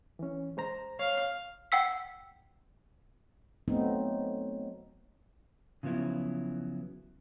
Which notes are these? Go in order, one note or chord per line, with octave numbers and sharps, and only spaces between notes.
E3 C#4
G#3 C5 A#5
C#5 F5
F#5 G5 E6 B6
F#3 A3 B3 C4 D#4
C#3 F3 F#3 B3 E4